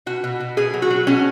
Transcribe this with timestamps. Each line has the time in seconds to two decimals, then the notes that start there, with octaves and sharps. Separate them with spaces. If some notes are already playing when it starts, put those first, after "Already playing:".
0.06 B2 F#4
0.24 B2
0.40 B2
0.57 B2 G#4
0.74 F#3
0.82 F#4
0.90 F#3
1.07 B2 C#4